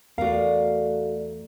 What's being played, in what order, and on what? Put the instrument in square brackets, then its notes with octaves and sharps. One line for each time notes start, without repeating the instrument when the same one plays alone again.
[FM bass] E2 [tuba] A3 [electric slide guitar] F#4 F5 [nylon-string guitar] A#4 D5